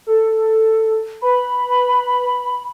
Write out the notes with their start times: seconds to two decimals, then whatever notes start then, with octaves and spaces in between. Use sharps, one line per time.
0.07 A4
1.22 B4 B5